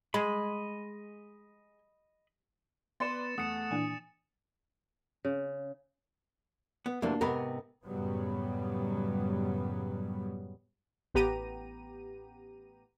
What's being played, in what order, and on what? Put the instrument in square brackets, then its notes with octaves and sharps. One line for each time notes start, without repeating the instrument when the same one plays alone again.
[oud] G#3 [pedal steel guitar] D#5 B5
[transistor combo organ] B3 [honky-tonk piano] B4 D5 C6 [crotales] A6 C#7 E7
[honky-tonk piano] E2 [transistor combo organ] A3 F#5 [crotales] D#6 C#7 E7
[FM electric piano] A#2 E3 D4 [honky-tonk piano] G#5
[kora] C#3
[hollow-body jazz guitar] B3
[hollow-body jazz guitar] D2 C3 E3 [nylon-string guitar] A#3 D4
[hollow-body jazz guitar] G#2 B3 B5 [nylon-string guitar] C3 A#4
[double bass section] F#2 A2 C#3 F#3 G3 B3
[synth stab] A1 B3 G4 A#5 D#7